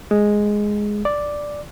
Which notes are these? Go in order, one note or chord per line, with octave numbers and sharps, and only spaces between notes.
G#3
D5